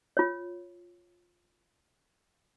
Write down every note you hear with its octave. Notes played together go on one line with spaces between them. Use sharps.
F4 C#5